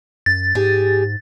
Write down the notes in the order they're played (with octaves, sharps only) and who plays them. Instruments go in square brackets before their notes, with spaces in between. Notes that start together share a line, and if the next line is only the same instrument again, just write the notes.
[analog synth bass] F#2 [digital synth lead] A6
[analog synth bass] G#2 [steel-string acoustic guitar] G4 G#4